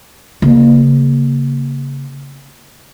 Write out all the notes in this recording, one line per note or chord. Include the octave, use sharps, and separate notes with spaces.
C#3 A#3